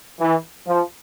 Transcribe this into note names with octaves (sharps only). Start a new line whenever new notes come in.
E3
F3